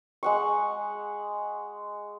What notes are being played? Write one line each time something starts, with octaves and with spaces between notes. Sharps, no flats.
G#3 F#5 C#6